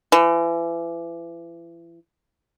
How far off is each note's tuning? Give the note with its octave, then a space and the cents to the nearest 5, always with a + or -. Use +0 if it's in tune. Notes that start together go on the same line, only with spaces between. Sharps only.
E3 +35